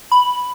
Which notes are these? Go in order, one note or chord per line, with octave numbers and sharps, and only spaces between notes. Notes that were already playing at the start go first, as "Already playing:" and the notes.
B5